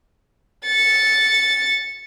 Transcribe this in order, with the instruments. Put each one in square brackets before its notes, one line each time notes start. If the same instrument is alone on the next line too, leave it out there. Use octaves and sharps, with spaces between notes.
[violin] A6 C#7